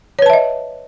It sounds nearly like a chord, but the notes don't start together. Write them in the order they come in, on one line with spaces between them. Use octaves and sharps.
C#5 B4 A5 E5 D#5